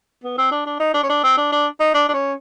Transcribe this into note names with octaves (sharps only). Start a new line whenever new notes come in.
B3
C4
D4
D4
D#4
D4
C#4
D4
C4
D4
D4
D#4
D4
D4
C#4